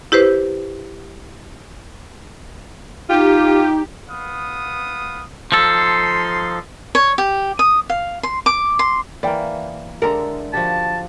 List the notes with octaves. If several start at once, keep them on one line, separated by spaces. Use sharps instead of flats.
E4 G4 B4 C5
D#4 F4 G4
B3 F5 D#6
F3 D#4 A4 C6
C#5
G4
D#6
F5
C6
D6
C6
E3 A#3 D5 G5
D3 G#3 A4 A#4 D5 E5 A#5
F3 F#4 G4 A5